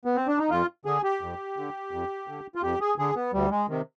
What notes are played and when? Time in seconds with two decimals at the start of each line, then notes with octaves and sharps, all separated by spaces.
0.05 B3
0.16 C4
0.28 D4
0.39 D#4
0.50 F2 F4
0.85 D3 G#4
1.03 G4
1.21 F2
1.57 D3
1.91 F2
2.28 D3
2.55 F4
2.62 F2 G4
2.81 G#4
2.99 D3 G#4
3.16 B3
3.33 D2 G3
3.50 G#3
3.69 C3 D#3